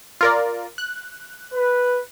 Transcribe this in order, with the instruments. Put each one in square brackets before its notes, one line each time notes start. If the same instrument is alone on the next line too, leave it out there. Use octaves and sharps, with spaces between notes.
[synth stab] F4 A#4 D5
F#6
[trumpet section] B4